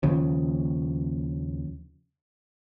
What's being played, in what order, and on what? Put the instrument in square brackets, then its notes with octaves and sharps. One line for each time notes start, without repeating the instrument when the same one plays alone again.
[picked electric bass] D#2 C#3 F3